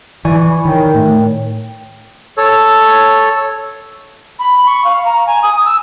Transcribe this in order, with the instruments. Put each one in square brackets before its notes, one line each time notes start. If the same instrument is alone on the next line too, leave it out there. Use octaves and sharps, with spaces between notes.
[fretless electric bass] E3 [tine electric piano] D5 G#5 C#6
[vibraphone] B5
[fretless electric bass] D#3 [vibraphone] A#4 C#5 G5
[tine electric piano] A2 A3
[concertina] A4 C#5
[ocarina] B5
C#6
F5
A#5
G#5
D#6
E6